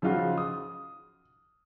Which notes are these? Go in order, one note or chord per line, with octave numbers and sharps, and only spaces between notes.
C#3 F3 D#4 F4 F#4 G#4
D#6